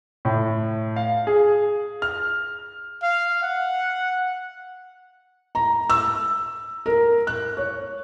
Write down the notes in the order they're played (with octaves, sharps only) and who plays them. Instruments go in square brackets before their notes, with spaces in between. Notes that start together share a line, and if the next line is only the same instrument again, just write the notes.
[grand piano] A2
F5
G#4
F6
[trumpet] F5
F#5
[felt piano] A#5
E6
A#4
F#6
C#5